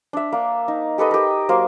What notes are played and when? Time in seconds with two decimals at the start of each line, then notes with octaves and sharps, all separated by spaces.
0.13 D4 E5
0.32 A#3 D4
0.68 D#4
0.98 G4 A4 B4 D#5
1.11 G4 A#4
1.49 F#3 A#3 C5